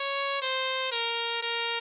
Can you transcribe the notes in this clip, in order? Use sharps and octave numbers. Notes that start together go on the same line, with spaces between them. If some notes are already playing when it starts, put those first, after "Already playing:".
Already playing: C#5
C5
A#4
A#4